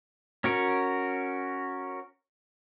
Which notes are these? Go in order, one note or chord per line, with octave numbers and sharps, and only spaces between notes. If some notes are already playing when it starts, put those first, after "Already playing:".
C#4 F#4 A#4